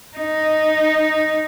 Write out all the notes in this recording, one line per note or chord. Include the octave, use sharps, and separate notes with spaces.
D#4